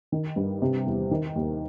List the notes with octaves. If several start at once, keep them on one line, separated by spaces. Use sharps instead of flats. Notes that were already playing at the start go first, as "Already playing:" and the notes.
D#3
G2
C3
E2
D#3
D#2